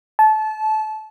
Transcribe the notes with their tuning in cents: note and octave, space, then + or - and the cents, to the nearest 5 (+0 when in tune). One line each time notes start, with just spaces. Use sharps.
A5 -25